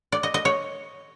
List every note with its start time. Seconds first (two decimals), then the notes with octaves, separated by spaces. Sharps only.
0.12 D5
0.23 D#5
0.34 D#5
0.45 C#5